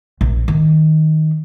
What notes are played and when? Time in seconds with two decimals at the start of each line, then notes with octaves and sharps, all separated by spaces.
0.21 A#1
0.48 D#3